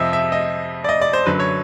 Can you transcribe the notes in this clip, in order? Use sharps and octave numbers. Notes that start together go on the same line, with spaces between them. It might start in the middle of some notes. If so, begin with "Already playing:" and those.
Already playing: F2 C3 F3 D#5 E5
E5
D#5
D5
D#5
D5
C5
F#2 D3 F#3 B4
C#5